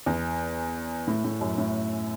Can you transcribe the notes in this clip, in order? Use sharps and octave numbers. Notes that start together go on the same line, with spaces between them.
E2
A2
A2
F#2
A2